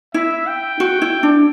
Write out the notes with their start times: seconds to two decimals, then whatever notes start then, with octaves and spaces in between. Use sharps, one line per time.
0.14 E4 E5
0.47 G5
0.80 F#4
1.02 E4
1.23 D4